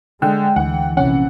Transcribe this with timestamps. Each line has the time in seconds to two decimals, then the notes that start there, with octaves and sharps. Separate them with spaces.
0.22 D3 G#3 G5
0.56 D2 E3 F#5
0.97 A#1 C3 E3 C#4 F#5